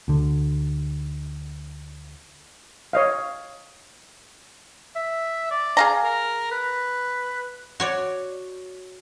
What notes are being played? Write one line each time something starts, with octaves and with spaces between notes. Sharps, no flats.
D2 D3
C#5 D#5 F5
E5
D5
G#4 F5 A#5
A#4
B4
F#4 C#5 D5